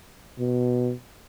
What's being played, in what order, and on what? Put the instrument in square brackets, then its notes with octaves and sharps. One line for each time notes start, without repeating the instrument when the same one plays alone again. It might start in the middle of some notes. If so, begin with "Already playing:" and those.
[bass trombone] B2